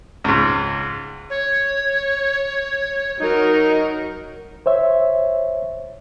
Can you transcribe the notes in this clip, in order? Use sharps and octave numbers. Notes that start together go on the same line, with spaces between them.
C#2 G#2
C#5
F#3 D#4 A#4
C5 C#5 E5